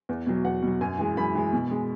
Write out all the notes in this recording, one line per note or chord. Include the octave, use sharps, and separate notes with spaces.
E2
B2 F#3
E2 F#5
B2 F#3
F#2 G#5
E3 G#3
F#2 B5
E3 G#3
B2
G#3